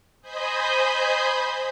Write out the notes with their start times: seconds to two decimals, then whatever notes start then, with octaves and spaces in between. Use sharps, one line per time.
0.22 C5 D#5 G#5 B5 D#6 G6